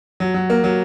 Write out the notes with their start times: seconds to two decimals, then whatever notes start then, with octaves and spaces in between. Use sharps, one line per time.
0.20 F#3
0.34 F#3
0.50 A#3
0.64 F#3